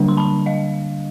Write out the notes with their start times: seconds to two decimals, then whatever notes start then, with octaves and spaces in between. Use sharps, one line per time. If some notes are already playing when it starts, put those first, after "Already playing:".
Already playing: D3 G3 A#3 D4
0.08 C6
0.17 A5 B5
0.46 D#5 F5